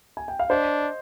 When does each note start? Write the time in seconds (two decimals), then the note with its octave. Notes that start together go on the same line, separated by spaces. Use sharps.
0.17 G#5
0.28 G5
0.39 F5
0.50 D4 C5 D#5